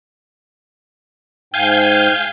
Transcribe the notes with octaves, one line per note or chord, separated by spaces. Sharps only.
G#2 F5 G5 G#5 G6